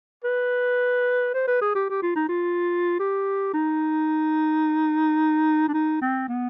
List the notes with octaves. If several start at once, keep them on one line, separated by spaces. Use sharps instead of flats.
B4
C5
B4
G#4
G4
G4
F4
D#4
F4
G4
D#4
D4
D#4
C4
B3